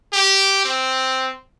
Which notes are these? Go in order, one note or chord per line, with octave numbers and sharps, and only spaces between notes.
G4
C4